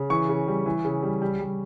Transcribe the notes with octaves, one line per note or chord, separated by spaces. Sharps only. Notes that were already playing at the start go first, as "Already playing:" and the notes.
Already playing: C#3
E3 C#6
C#3
G3
E3
C#3
G3
G3
G3